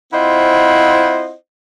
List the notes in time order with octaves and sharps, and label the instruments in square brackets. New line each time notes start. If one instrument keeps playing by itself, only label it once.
[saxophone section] C4 E4 F4 C5 D#5 F#5